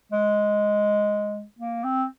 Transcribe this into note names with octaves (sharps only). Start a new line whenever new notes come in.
G#3
A#3
C4